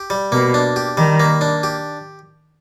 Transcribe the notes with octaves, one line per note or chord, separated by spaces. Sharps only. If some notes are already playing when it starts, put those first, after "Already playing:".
Already playing: G4
G3
B2 A#3
D4
G4
D#3 G3
A#3
D4
G4